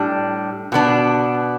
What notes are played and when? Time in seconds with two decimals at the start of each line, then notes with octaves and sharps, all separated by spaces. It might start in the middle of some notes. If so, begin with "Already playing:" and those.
Already playing: A2 G3 D4
0.72 B2 B3 D4